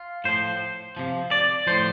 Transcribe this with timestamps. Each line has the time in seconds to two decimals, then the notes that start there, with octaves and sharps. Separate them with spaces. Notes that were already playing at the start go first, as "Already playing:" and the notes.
Already playing: F4
0.24 A2 F3 C5
0.97 C3 F3
1.31 D5
1.67 A2 F3 C5